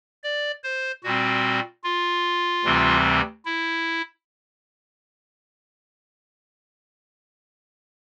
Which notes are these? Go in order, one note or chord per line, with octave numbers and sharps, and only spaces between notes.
D5
C5
A#2 G3 C4 F#4
F4
D2 C3 E3 G3 C4
E4